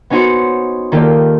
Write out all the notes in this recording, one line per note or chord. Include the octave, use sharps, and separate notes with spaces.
B3 C#4 D#4 F#4 C5 C#7
D#3 A#3 F4 G4 A4 D5